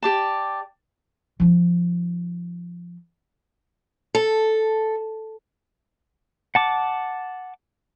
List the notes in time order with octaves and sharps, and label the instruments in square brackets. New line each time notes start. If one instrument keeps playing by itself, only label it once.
[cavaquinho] G4 D5 A5
[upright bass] F3 D#4
[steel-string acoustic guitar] A4
[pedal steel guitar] F#5 A5 D6